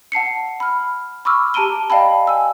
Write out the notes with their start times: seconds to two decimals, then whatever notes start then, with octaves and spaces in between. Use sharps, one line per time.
0.12 F#5 A5 C7 C#7
0.60 B5 F6
1.25 B5 C#6 D6 E6 F6
1.54 G4 A5 A#5 D7 D#7 G7
1.90 D5 D#5 F5 G5 A5 B5
2.27 G#5 E6